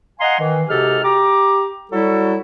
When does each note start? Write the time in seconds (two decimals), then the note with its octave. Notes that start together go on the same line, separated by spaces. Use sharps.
0.20 D#5 F5 F#5 G#5 A#5 C6
0.40 D#3 E3
0.68 G#2 C3 F#4 G4 A4 F6
1.04 G4 A#5 D6
1.91 F#3 G3 E4 F#4 A4